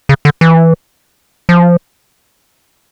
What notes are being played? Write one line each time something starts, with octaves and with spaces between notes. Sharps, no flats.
C#3
D3
E3
F3